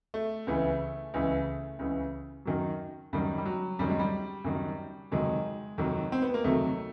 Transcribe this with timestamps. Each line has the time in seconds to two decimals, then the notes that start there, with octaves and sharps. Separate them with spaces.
0.14 A3
0.47 C#2 C#3 E3
1.14 C#2 C#3 E3
1.79 C#2 C#3 E3
2.45 F#2 D#3 F#3
3.13 F#2 D#3 F#3 G3
3.38 G3
3.45 F#3
3.79 F#2 D#3 F#3 G3
3.89 G#3
3.99 G3
4.44 F#2 D#3 F#3
5.11 F2 C3 D#3 F#3 G#3
5.78 F2 C3 D#3 F#3
6.12 C4
6.22 B3
6.34 A#3
6.44 F2 C3 D#3 F#3 A3